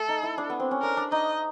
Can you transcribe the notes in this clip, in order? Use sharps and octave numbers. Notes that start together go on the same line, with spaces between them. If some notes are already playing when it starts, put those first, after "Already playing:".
Already playing: A3 A4
D#4
E4
D4
B3
C4
C#4
D4 A#4
D4
D#4 D#5